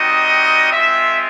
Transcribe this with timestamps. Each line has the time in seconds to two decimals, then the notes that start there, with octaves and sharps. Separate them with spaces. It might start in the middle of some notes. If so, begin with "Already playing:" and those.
Already playing: G3 C4 D#4 F#4 D#5
0.72 G#3 C4 F4 E5